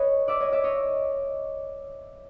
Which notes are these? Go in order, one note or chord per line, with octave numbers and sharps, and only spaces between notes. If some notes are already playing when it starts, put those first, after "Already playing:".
Already playing: B4 C#5 D#5
D5 E5
C#5 D#5
D5 E5
C#5 D#5